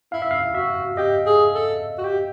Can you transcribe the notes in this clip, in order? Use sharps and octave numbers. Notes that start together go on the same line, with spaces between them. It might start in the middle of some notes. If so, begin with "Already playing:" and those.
E4 F5
E5
F5
F#4 E5
G4 D#5
G#4
A4
F#4
G4